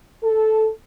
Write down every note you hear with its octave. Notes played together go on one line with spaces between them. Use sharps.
A4